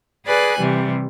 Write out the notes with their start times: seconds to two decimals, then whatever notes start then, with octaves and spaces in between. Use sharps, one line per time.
0.25 G#4 B4 D5 G#5 F#6
0.58 C3 E3 G3